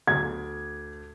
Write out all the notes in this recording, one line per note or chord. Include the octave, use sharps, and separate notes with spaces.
D2 G#6